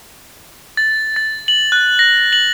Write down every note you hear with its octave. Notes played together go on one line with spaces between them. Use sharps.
A6
A6
F#7
F#6
A#6
F#7